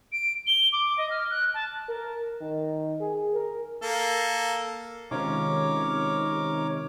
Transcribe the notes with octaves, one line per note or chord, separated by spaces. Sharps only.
D7
G7
D6
D#5
F6
F#6
A5
A#4
D#3
G#4
A#4
A#3 A4
C3 D#3 G#3 C#4 F4 A#4 C#5 D6